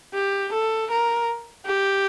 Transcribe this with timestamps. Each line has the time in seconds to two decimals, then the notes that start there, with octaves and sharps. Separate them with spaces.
0.14 G4
0.52 A4
0.90 A#4
1.65 G4